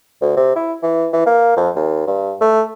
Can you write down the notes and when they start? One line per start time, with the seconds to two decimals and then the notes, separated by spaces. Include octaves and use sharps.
0.21 D2
0.37 C3
0.56 E4
0.82 E3
1.13 E3
1.26 A#3
1.56 F2
1.76 D#2
2.07 G2
2.41 A3